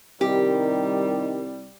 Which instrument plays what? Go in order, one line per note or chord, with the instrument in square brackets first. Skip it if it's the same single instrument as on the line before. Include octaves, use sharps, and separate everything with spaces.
[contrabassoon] C2 [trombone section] D#3 [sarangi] G3 [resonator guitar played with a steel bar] G4